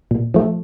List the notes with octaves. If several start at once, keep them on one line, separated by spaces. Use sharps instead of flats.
A#2
F3 A3